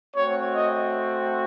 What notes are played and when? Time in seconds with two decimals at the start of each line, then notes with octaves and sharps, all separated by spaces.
0.14 A3 C4 F#4 C#5
0.54 D#5